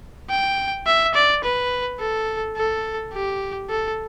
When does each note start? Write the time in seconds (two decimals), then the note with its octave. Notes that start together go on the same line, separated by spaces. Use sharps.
0.30 G5
0.87 E5
1.15 D5
1.44 B4
2.00 A4
2.57 A4
3.13 G4
3.70 A4